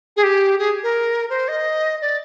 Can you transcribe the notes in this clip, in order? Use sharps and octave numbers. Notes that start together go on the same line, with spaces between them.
G#4
G4
G#4
A#4
C5
D#5
D5